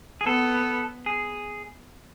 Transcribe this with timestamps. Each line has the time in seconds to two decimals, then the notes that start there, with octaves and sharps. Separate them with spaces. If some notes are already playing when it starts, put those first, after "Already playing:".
0.21 G#4
0.26 B3 A4
1.06 G#4